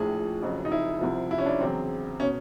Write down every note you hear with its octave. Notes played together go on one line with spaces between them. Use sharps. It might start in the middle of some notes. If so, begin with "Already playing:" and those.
Already playing: A#1 A2 F3 G#4
F#1 F2 C#3 F#3
D#4
E4
C2 C3 F3
E4
C#4
D4
E2 C#3 F#3 C4
B2 C#4